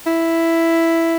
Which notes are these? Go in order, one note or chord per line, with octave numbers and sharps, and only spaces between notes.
E4